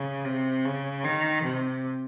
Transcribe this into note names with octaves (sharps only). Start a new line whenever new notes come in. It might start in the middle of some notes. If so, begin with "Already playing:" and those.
Already playing: C#3
C3
C#3
D#3
C3